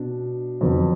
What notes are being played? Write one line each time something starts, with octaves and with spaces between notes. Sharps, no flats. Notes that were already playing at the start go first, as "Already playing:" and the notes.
Already playing: B2 D4
F2 D3 F#3 B3 D4